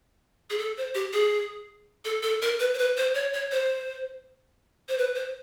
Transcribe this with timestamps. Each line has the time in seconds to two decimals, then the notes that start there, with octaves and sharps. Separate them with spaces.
0.50 G#4
0.58 A4
0.78 C5
0.95 G4
1.13 G#4
2.05 A4
2.23 A4
2.42 A#4
2.60 B4
2.74 C5
2.78 B4
2.97 C5
3.15 C#5
3.34 C#5
3.52 C5
4.89 C5
4.98 B4
5.15 C5